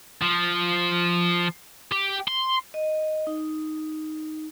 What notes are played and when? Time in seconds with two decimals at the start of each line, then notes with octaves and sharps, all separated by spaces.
0.22 F3
1.92 G4
2.28 C6
2.74 D#5
3.27 D#4